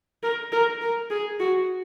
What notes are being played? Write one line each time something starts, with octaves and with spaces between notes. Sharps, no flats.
A#4
A#4
A#4
G#4
F#4